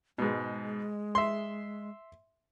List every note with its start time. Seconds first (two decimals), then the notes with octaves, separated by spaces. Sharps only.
0.18 G#2 B2 G#3
1.15 E5 C6